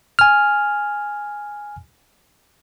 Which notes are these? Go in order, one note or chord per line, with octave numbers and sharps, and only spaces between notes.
G#5 F6